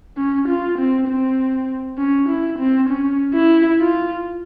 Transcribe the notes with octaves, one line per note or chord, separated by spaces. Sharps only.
C#4
F4
C4
C4
C#4
E4
C4
C#4
E4
F4